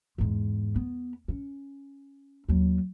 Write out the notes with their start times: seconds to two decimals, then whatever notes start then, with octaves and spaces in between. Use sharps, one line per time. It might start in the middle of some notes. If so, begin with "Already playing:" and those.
0.18 E2 G#2
0.76 B3
1.28 C#4
2.49 D#2 F#3